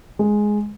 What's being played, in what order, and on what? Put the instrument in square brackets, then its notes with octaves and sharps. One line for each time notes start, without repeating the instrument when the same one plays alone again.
[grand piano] G#3